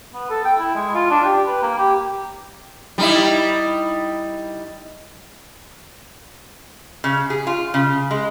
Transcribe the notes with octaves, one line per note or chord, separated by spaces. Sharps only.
B3
A4
G5
E4
G#3
F4
D4
G4
B4
A#3
G4
G3 D#4 E4
C#3
G#4
F4
C#3
G#3